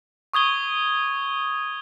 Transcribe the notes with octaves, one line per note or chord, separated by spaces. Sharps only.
C#6 D#6 G#6 G7